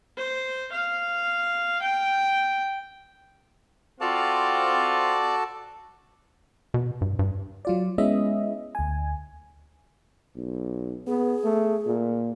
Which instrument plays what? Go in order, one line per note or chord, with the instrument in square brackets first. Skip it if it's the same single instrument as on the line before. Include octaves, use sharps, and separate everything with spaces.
[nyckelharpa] C5
F5
G5
[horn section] C4 F4 [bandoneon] F#4 A4 A5 [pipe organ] D5
[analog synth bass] B2
G2
G2
[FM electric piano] F#3 F4 D5
G#3 B3 C#4 E4 D#5 E5
D2 G#5
[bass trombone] B1
[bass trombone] B3 [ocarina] G#4
[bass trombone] A3
A#2